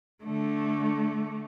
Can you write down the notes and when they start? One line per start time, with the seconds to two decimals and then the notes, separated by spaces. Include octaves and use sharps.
0.24 D3 A3